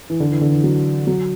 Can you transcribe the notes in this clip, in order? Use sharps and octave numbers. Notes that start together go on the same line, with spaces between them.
E3
D3
E3
D3
E3
F#3
F#3